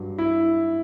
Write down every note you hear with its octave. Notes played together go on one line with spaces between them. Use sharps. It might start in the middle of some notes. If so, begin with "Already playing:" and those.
Already playing: G2 F#3
E4